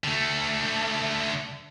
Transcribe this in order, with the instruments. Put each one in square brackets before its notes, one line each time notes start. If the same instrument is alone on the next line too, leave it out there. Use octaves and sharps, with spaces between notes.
[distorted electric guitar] D3 A3